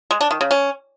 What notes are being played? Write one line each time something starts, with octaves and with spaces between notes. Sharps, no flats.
G#3
D4
D#3
C#3
C#4